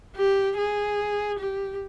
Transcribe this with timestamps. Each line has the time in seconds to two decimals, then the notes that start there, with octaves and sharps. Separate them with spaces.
0.16 G4
0.58 G#4
1.39 G4